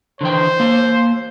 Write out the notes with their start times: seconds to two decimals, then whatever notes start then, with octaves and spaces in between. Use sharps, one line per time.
0.21 D3 E3 C5 G5
0.60 A#3 G4